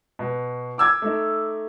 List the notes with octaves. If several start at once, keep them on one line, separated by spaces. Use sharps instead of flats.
B2
D6 E6 G#6
A3 D#4